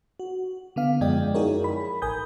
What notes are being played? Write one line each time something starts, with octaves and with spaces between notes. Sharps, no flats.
F#4
D3 B3 F5
F#2 F3 G#3 D5 D#5 G5
D#4 E4 F#4 G#4 A#4 C#5
B5
A1 A#4 G#5 D#6 G6